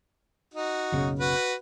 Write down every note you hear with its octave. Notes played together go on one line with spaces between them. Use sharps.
D#4 F#4
F#1 B1 C#3
F#4 B4